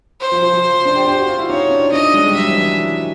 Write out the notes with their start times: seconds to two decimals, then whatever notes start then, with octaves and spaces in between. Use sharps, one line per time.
0.21 C5
0.32 F3
0.42 F3
0.53 F3
0.85 D4
0.96 G4
1.06 G4
1.17 F#4
1.28 F4
1.39 E4
1.49 D#4 C#5
1.71 D4
1.92 D4 D#5
2.14 G#3
2.26 G3
2.35 F#3 E5
2.49 E3